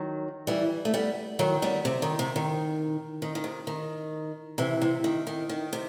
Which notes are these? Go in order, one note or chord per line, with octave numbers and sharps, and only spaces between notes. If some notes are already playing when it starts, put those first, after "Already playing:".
Already playing: D#3 F#3
E3 G3
A3
G3 B3
D#3 F#3
G3 B3
C3
D#3
C3
D#3
D#3
D#3
C3
D#3
C3 E3
C3 E3
D#3
D#3
D#3
C3